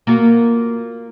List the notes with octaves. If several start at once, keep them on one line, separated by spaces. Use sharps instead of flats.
A#3 F4 F#4